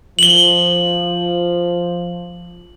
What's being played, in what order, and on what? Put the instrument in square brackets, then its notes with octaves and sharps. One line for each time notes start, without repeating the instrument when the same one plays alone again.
[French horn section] F3 [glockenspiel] F#7 G7